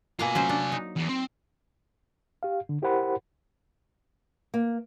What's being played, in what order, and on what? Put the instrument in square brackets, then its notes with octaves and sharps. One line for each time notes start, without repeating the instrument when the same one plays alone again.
[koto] B2 A#3 A#5 [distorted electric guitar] F4 G#5
[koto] F#3 C#4 C5
D4
D#4
[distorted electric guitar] E2
C4
[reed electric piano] G4 F5
D3
E4 G4 A#4 C5 F#5 B5
[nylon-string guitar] A#3